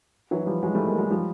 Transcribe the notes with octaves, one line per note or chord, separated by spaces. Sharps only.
E3 F#3
F3 G3
F#3 G#3
G3 A3
G#3 A#3
F#3 G#3
F3 G3